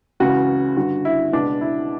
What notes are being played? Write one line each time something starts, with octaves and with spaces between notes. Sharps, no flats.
C#2 C#3 E3 F#4
G2 D3 F#4
E4
C#2 B2 D4
E4